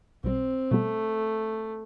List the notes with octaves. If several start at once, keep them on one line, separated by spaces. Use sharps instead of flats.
B1 B2 G3 C4
B2 G3 A3 B3